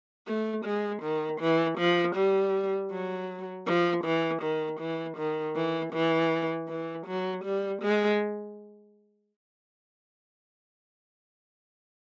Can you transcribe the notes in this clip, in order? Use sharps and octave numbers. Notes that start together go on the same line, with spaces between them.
A3
G#3
D#3
E3
F3
G3
F#3
F3
E3
D#3
E3
D#3
E3
E3
E3
F#3
G3
G#3